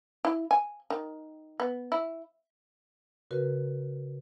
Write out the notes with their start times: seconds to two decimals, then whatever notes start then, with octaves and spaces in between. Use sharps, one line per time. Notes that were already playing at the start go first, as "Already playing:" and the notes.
0.25 E4
0.51 G#5
0.90 D#3
1.60 B3
1.92 E4
3.31 C#3 F#4 A#4 B4